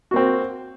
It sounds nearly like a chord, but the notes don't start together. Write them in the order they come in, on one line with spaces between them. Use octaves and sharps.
F#4 A#3 C4